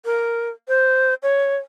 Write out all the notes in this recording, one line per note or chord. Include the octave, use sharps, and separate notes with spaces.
A#4
C5
C#5